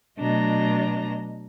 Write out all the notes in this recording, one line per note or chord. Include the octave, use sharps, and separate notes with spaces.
B2 F#3 A3 D4 D#5 A#5